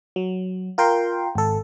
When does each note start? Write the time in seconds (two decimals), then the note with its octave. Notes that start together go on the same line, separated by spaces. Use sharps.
0.16 F#3
0.78 F4 A#4 G5 C6
1.35 G#1 A4